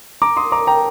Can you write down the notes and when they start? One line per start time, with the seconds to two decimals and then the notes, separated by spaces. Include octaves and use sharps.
0.22 A#5 D6
0.37 C6 D#6
0.52 A#5 D6
0.67 G5 A#5